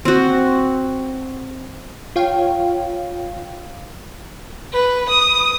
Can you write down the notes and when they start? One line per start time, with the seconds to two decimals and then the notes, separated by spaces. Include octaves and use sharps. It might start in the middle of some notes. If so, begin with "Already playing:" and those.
0.05 C4 F#4
2.16 F4 C#5 F5 G5
4.73 B4
5.09 D#6